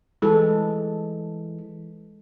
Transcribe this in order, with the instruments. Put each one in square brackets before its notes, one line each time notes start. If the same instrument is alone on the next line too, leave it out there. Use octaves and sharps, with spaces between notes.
[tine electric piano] E3 [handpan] G#3 A4